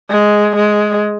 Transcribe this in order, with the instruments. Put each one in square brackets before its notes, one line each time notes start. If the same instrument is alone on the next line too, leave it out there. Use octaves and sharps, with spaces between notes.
[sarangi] G#3
G#3